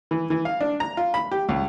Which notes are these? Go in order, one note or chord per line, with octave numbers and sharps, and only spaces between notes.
E3
E3
F5
D4
A#5
F4
B5
G4
C#2